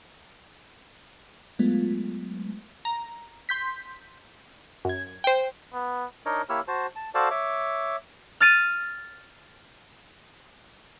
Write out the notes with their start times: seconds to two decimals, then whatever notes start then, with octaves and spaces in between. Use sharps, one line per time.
1.59 F#3 G#3 A3 B3 F4
2.85 A#5
3.49 C6 G6 B6
4.85 F#2 G#6
5.24 C5 G5
5.73 B3
6.26 D4 D#4 A#4 C#5 D#5
6.49 A#3 E4 G4 C#5 E6 F6
6.68 F#4 C5 A5
6.96 A5
7.15 F#4 A4 C5 D5 F5 A5
7.31 C#5 E5 D6
8.40 F6 A6 D#7